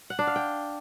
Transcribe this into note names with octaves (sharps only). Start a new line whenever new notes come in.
F#5
D4
F5
G5